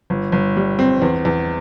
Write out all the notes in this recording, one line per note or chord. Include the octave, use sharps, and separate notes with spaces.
G1
G1
G3
C4
E2
E2